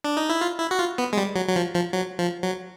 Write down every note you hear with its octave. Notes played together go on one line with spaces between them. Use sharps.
D4
D#4
E4
F4
E4
F#4
F4
B3
G#3
G3
F#3
F#3
F3
F3
F#3
F3
F#3